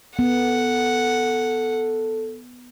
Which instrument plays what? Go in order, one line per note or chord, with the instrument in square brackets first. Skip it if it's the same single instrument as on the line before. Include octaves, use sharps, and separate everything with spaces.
[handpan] B3 [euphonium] A4 [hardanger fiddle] F#5